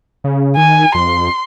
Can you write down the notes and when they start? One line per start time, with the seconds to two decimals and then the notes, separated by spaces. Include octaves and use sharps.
0.24 C#3
0.57 D#3 G#5
0.95 F2 C6